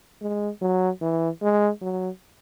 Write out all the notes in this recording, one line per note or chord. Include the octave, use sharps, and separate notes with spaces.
G#3
F#3
E3
G#3
F#3